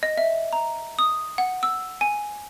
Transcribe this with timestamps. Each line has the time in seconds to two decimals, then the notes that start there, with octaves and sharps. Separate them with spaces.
0.03 D#5
0.17 E5
0.53 A#5
0.99 D#6
1.38 F#5
1.63 E6
2.01 G#5